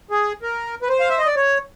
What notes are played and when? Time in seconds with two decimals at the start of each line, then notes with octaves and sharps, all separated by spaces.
0.11 G#4
0.42 A#4
0.82 B4
0.89 C5
1.00 F5
1.09 E5
1.18 D#5
1.26 D5
1.36 C#5